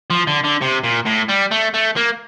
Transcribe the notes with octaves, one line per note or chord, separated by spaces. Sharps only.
F3
D3
D3
C3
A#2
A2
G3
A3
A3
A#3